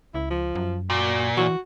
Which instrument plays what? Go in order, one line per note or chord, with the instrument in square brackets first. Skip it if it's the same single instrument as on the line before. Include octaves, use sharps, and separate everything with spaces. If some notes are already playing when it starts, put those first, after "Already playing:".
[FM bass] C#2 [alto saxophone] E4
[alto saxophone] F3
[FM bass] F#2
[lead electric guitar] A#2 [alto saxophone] F#4
[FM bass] E3 [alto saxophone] F#4